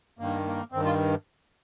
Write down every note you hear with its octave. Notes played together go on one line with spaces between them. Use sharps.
G2 D#3 A#3
A#3
G2 D#3 C4
F4